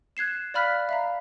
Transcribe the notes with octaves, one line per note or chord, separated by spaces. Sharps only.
F#6 G#6 C7 E7
D5 F5 B5 F6 F#6 B6
E5 F5 A#5